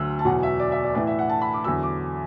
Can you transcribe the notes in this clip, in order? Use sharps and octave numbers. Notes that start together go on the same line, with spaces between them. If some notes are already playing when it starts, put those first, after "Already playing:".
Already playing: D2 D3 F#3 E6
A5
E2 B2 F#3 F#5
E5
D5
E5
D5
A2 E3 D5
E5
F#5
A5
B5
D6
E2 D3 F#3 E6
D6